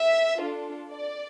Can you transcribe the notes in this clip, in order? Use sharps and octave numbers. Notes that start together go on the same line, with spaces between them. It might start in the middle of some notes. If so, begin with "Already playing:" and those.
Already playing: E5
D4 F4 A4
D5